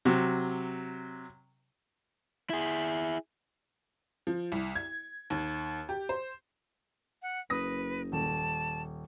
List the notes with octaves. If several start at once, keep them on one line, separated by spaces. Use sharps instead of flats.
C3 F#3
E4 G#4
F3
C2
G#6
D#2
G4
C5
F#5
F#1 B4 D#6 A#6
D#1 A5